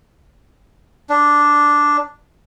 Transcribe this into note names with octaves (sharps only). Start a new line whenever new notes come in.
D4